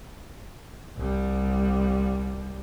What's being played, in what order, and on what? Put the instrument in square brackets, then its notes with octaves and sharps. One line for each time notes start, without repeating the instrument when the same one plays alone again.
[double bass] C2 G3